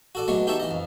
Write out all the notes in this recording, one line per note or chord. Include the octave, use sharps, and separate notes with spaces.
F#4 A4 D5
F#3 G#3 A3 B3 C#5
D#4 G4 C#5 E5 A5
E3 D#5
F2